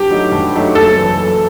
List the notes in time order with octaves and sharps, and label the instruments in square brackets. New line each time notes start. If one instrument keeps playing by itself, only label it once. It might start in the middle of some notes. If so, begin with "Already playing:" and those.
Already playing: [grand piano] G2 [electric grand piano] G4
[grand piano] F#3 A3 D#4
G2
F#3 A3 D#4
[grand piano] F#1 [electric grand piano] A4
[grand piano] F#2 E3
F#1